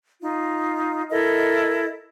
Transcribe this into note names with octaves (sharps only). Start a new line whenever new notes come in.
D#4 F4
E4 A4 A#4 D#5